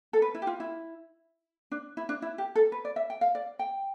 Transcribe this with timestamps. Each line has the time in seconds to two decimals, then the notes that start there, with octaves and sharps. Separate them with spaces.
0.13 A4
0.22 B4
0.35 E4
0.42 G4
0.47 F4
0.60 E4
1.72 D4
1.97 E4
2.09 D4
2.22 E4
2.38 G4
2.55 A4
2.72 B4
2.85 D5
2.96 E5
3.10 G5
3.21 F5
3.35 D5
3.59 G5